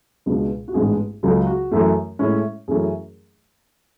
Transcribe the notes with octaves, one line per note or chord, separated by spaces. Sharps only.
C#2 B2 G#3 B3 D4
F#4
A1 G#2 G#3 B3 D4 G#4
C#2 C#3 F#3 A4
F#4
F#2 E3 A3
A2 G#3 C#4 E4
F#2 E3 A3 C#4 E4 G#4